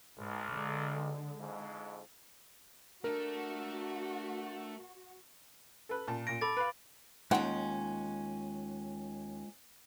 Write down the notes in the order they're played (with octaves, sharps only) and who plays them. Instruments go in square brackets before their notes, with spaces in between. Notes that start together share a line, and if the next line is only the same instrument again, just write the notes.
[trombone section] B1 [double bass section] G#2
[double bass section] D3 G#3
[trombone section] F2 G#2
[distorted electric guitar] A3 A4 [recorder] D4 [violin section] F#4 [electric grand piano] A#4
[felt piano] A4 B4
A#2 A5
[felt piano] A#2 A#6 [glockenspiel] D7
[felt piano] A4 [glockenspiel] B5 D6 A6
[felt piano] B4 F5
[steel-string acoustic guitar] D#2 C#4 [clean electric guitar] G#3 F4 C6 [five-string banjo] D#4 F#5 G5